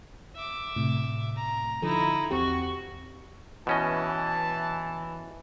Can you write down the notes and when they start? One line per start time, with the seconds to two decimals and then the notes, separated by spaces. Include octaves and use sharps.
0.35 E5 D6
0.76 A2 C3
1.36 A#5
1.82 D3 F3 D#4 E4 A4
2.31 E2 C4 F#4 G4 C#6
3.67 B2 E3 C#4 D#5 A5